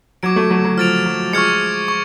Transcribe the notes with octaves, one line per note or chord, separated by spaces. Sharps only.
F#3 D6 G#6 D7
F#3 A3
F#3 A3
F#3
F3 F6 A6 D7 F7
F#3
F3 G#3 C#6 F6 G#6 C#7
C#6